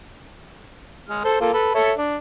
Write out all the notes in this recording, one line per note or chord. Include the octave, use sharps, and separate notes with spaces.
G#3 F6
A4 C5
A#3 F4 A4
A4 B4
A4 C#5 E5
D4